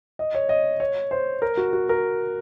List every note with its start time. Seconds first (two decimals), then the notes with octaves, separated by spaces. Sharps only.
0.19 D#5
0.35 C#5
0.49 D#5
0.80 C#5
1.11 C5
1.42 A#4
1.57 F#4
1.73 F#4
1.89 A#4